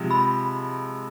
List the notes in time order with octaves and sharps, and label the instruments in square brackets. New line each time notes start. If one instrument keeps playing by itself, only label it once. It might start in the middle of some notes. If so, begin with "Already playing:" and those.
Already playing: [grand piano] C3 F3 G#3
[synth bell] B5